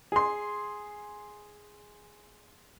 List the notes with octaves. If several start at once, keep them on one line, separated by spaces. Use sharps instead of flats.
G#4 C6